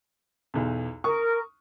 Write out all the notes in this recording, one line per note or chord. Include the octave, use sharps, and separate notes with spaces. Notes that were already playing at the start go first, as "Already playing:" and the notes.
B1 E2
A#4 C#6 D#6